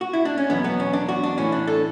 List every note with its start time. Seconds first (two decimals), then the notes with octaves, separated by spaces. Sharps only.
0.01 F#4
0.13 E4
0.25 D4
0.38 C#4
0.50 E2 B2 F#3 B3
0.64 B3
0.80 C#4
0.93 D4
1.09 F#4
1.23 D4
1.38 A2 E3 C#4
1.52 D4
1.67 A4